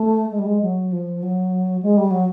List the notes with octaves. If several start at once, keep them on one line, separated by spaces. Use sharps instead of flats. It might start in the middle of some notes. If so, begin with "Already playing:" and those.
Already playing: A3
G#3
G3
G#3
F#3
F3
F#3
G#3
G3
F#3